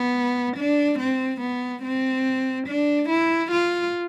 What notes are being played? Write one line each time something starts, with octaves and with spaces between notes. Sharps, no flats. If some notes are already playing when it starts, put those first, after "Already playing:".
Already playing: B3
D4
C4
B3
C4
D4
E4
F4